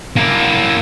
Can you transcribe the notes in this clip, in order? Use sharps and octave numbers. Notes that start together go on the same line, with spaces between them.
A#3 E4